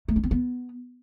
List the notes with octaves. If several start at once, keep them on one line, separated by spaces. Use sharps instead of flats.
A3
D4
C4
B3